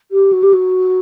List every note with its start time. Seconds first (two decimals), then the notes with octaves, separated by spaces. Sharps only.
0.11 G4
0.32 F#4
0.43 G4
0.53 F#4